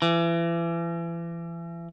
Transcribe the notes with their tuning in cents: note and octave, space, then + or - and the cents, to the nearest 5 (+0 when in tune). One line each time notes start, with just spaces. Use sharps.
E3 +35